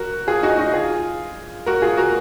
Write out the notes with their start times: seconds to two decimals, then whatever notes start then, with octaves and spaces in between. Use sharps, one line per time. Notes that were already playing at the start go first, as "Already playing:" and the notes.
Already playing: F#4 A#4
0.27 F4 G#4
0.43 D#4 F#4
0.58 D#4 F#4
0.74 F4 G#4
1.66 F#4 A#4
1.82 F4 G#4
1.97 F#4 A#4